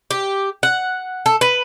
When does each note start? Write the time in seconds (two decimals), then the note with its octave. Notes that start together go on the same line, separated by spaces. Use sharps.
0.11 G4
0.63 F#5
1.26 A4
1.41 B4